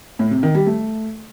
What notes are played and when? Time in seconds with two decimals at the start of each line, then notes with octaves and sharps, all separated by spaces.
0.19 A2
0.31 C3
0.43 D#3
0.55 G3
0.67 A3